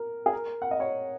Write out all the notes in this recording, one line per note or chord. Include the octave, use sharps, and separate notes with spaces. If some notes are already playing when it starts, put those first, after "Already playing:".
Already playing: A#4
G#4
A#4
F#5
D#5
C#5